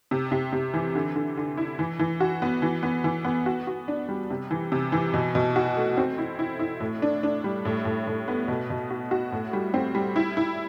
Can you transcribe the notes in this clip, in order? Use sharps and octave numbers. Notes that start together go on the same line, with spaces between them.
C3
C3
C3
E3
D3
D3
D3
E4
E3
E3
F#4
B3
E3
B3
E3
B3
F#4
F#4
D4
G3
C3
E3
C3
E3
B2
B2
F#4
A3
C4
E4
E4
E4
A2
D4
D4
G3
A2
A2
A2
B3
B2
B2
F#4
F#4
A2
G3
C4
G3
E4
E4